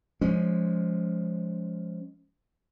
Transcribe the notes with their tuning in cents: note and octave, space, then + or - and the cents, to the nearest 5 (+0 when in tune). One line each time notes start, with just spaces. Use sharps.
F3 +0 G#3 +0 C#4 +15